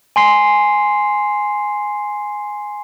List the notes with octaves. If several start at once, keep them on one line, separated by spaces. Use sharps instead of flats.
G#5 C6 C7